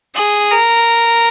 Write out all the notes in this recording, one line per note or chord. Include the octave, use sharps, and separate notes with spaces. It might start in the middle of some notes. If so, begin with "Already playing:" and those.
G#4
A#4